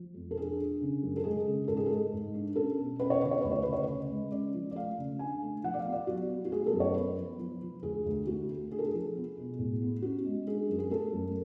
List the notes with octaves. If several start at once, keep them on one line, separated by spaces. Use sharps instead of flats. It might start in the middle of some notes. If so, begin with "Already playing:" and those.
Already playing: F3
F2
A4
D4 G#4
D4
C#3
F#2
A4
G#3 G#4
C#3
G#2 A4
G#4
G#3 A4
G#2
D4
C#4 A4
B2
C#4 B4
C#5
D3 B4
C#5
D2 B4
C#5
C#3 B4
C#5
C#3 B4
G#3
C#4 D5
F3
D5
A3 F5
C#3
D4 G#5
A3
F3 F#5
D5
F5
B3
D5
F#3 F#4
B3
F#4
A3 G#4
A4
F#2
C#5
B3 B4
F3
F3
F3
D2 G#4
D2
A3 F#4
A3
D4 G#4
A4
G#4
F3
B3
B2
A2
B3
C#4 F#4
G#3
D4 G#4
F#2
G#4
A3 A4
F#2